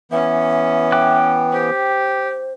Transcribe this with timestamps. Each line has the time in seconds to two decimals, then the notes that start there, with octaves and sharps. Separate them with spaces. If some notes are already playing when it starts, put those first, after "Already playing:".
0.12 E3 B3 C#4 E5
0.92 G5 D6 F#6
1.52 G4 C5